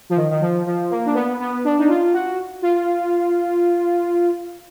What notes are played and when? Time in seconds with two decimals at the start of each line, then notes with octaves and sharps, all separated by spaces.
0.10 F3
0.16 D#3
0.31 D#3
0.41 F3
0.67 F3
0.91 A#3
1.06 D4
1.14 B3
1.40 B3
1.64 D4
1.79 D#4
1.88 F4
2.13 F#4
2.62 F4